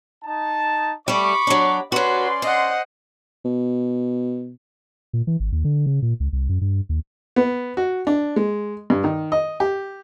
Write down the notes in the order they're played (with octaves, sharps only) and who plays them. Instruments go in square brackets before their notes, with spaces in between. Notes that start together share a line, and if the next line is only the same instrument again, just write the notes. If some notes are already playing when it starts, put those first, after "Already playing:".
[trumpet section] D#4 A5
[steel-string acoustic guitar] G3 A3 [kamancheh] B5 D6 [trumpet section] C#6
[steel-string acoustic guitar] F#3 D4
[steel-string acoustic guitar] F#3 F#4 [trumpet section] C#4 D5 C6 [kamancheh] B4
[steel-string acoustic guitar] C5 [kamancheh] D#5 F#5
[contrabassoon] B2
[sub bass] A#2
E3
G#1
D#2
D3
C#3
A#2
C#2
C2
F#2
G2
D#2
[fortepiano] B3
F#4
D4
G#3
G2
D#3
D#5
G4